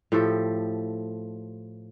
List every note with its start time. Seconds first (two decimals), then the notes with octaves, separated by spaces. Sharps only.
0.12 A2 F3 G4 A4